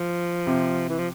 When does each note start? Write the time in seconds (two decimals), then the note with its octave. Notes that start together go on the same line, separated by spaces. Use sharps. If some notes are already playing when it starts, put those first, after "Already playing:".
Already playing: F3
0.47 C3
0.89 E3
0.98 F3